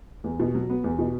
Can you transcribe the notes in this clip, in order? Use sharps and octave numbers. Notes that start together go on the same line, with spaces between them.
E2
B2
F#3
B3
E2
B2